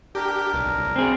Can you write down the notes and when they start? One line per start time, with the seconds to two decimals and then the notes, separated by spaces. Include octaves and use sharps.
0.15 D4 G4 A#4
0.53 B1
0.96 C4 G#4